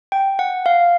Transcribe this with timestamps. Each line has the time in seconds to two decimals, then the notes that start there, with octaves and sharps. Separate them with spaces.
0.12 G5
0.39 F#5
0.66 F5